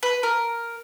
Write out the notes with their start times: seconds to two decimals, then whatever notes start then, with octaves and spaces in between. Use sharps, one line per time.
0.03 B4
0.23 A#4